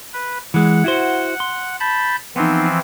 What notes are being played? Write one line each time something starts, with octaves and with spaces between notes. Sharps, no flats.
B4
E3 G#3 F#5
E4 F#4 C5
C6
A5 B5 G6
E3 F3 B3 C4 D#4